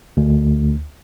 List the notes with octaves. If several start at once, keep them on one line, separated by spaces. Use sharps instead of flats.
D2